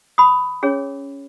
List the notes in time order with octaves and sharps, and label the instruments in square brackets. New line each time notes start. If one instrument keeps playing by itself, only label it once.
[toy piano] B5 D#6
C#4 G#4 C#5